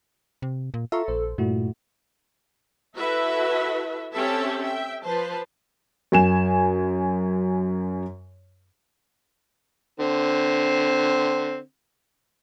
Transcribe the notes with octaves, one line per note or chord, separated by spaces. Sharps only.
C3
A#2
F4 A4 E5 A#5 C#6
A#1 C5
G2 A#2 A3 E4 F#4
E4 F#4 A4 B4 E5
C4 C#4 G4 A4 E5 A5
E5 G5
F3 B4 C5 A5
F#2 G#5 E7
D3 C4